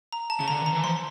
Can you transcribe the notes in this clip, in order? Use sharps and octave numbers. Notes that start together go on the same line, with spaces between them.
A#5
A5
C#3 A5
D3 A#5
D#3 A#5
E3
F3 C6